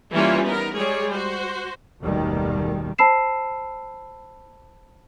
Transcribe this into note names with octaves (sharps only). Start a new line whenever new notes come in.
E3 G3 A#3 C#4 E4 F4
B3 D#4 A#4
G3 G#3 G#4 C#5
F#4 C5
F#1 D#2 B2 D#3 G3 A3
C5 A5 B5 E6 C7 E7